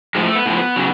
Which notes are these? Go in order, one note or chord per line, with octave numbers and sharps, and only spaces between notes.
A2 F3 G#3
A3
B3
A2 F3
C#3 F#3